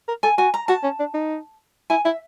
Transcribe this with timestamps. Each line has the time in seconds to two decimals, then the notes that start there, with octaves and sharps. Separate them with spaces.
0.08 A#4
0.23 A4 G#5
0.38 F#4 G#5
0.54 A#5
0.68 F#4 A5
0.83 C#4
0.99 D4
1.14 D#4
1.90 E4 G#5
2.05 E4 E5